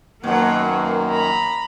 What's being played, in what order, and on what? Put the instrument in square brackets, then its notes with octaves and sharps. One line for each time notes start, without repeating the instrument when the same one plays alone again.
[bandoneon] F#2 D#3 [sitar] B2 F#3 [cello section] A#3 [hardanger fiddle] F#5
[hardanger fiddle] A#5 B5